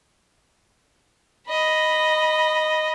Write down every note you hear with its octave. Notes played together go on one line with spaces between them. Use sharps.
D#5 B5